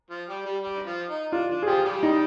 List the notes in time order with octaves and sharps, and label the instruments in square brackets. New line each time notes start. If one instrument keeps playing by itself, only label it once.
[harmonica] F3 F4
G3 G4
G3 G4
G3 G4
F3 F4
D#4
[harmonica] D4 [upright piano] F4
[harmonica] D4
[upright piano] G#4
[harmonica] F3 F4 [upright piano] G4
[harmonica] G3 G4
[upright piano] D#4